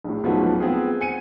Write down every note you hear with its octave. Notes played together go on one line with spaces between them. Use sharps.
A#1 A2
C#2 G#2 F3 F#3 A3 B3
B3 C4 F4 G#4
G#5 C#7 D#7